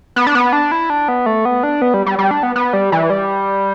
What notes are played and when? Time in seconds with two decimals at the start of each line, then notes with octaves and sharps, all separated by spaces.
0.16 B3
0.27 D4
0.35 B3
0.53 D4
0.72 E4
0.90 D4
1.08 B3
1.26 A3
1.45 B3
1.63 D4
1.82 B3
1.94 G3
2.06 G3
2.19 G3
2.31 D4
2.43 B3
2.56 B3
2.73 G3
2.92 E3
3.10 G3